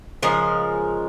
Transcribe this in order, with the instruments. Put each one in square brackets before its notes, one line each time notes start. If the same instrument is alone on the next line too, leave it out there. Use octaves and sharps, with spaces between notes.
[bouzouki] C#3 F3 G#3 A#4